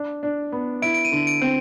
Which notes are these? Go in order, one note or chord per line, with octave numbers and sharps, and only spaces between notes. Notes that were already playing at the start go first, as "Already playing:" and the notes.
Already playing: D4
D4
B3
E4 D7
D7
D#7
D3
D7
C4